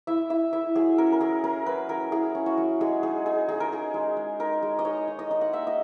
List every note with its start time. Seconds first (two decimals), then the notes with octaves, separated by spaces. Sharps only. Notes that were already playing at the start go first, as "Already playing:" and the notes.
0.07 E4 E5
0.30 E4 E5
0.53 E4 E5
0.75 F#3 G#4
0.98 C#4 A#4
1.12 A#4
1.21 C#4 G#4
1.44 C#4 A#4
1.66 F#3 B4
1.89 C#4 A#4
2.12 E4 G#4
2.35 C#4
2.46 F#4
2.57 F#3
2.81 G#3 G#4
3.03 D#4 G#4
3.26 D#4 G#4
3.48 D#4 G#4
3.60 A#4
3.71 D#4 G#4
3.94 G#3
4.17 G#3
4.40 D#4 A#4
4.62 G#3
4.79 D#5
4.85 D#4 C#5
5.08 D#4
5.19 D#5
5.31 D#4
5.41 F#5
5.53 A#3 E5
5.67 D#5